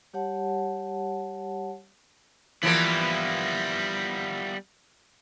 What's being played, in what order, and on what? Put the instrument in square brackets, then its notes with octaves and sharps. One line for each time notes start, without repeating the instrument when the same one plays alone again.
[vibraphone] G3 G4 C#5 F#5 A5
[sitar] E3 F3 A#3 [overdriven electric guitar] G3 B3